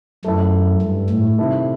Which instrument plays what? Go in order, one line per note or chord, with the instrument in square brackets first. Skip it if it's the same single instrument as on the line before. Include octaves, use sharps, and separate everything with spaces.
[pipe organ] F#2 [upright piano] A3 E4 A4
[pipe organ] G2
A2
[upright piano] C3 D#3 A3 E4 A4